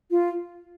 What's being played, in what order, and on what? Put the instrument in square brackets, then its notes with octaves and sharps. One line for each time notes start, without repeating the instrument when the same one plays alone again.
[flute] F4